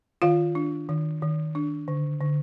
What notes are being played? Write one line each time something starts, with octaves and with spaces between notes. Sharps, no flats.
D#3 F4 F5
D4
D#3
D#3
D4
D3
D3